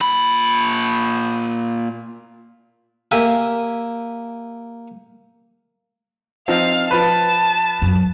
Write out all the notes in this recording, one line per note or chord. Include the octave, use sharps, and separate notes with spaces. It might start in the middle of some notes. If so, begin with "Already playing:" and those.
A#2 B5
A#3 G4 E5 G#5
F3 C4 D#4 F5
F3 B4 A5
F#2